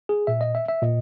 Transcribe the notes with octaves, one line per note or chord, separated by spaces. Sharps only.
G#4
A#2 E5
D#5
E5
E5
A#2 D#5